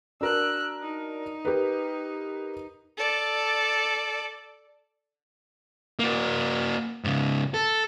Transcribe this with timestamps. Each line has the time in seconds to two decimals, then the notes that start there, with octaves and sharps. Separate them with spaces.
0.21 D4 F#4 A#4 E6 F#6
0.82 D#4
1.45 G4 A#4 B4
2.97 A4 D5
5.99 A#3 F#4
7.04 G#2 C#3
7.54 A4